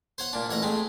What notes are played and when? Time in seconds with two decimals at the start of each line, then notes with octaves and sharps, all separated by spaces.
0.18 C5 C#5 F#5
0.33 A#2 D4
0.50 A1 C#5 F#5 A#5
0.62 G#3 A3 C4